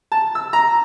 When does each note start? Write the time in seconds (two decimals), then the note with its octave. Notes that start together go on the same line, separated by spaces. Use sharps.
0.12 A5
0.35 E6
0.53 A#5